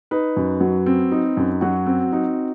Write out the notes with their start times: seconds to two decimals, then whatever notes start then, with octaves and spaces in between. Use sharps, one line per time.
0.11 D#4 B4
0.37 F#2
0.61 F#3
0.86 C4
1.11 D#4
1.37 F#2
1.61 F#3 F#4
1.87 C4
2.12 D#4